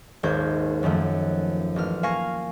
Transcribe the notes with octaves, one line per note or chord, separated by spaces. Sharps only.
D#1 G#1 D#2 C5 G6 G#6
F#2 D#3 F3 A3
A1 F6
A#3 F5 G#5 C#6 A#6